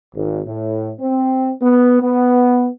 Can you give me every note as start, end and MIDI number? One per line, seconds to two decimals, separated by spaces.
0.15 0.41 32
0.46 0.92 45
1.00 1.51 60
1.61 1.97 59
2.01 2.68 59